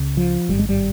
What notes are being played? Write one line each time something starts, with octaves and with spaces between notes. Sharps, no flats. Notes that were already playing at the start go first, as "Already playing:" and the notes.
Already playing: C#2 C#3
F3
G#1 G2 G3
G#3
G3